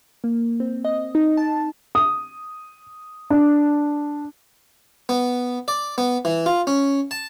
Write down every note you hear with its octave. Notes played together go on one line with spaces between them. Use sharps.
A#3
C4
D#5
D#4
A5
D#6
D4
B3
D5
B3
E3
F4
C#4
A5